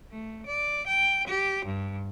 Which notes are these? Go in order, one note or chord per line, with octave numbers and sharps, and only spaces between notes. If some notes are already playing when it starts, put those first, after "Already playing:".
A3
D5
G5
G4
G2